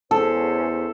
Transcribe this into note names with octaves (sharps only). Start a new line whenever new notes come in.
E2 C#4 A4 C5